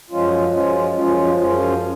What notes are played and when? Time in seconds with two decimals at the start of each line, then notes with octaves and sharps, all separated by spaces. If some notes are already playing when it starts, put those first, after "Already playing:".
0.10 F#2 F3 G#3 C#4 F4
0.53 F#2 F3 G#3 C#4 F4
0.96 F#2 F3 G#3 C#4 F4
1.39 F#2 F3 G#3 C#4 F4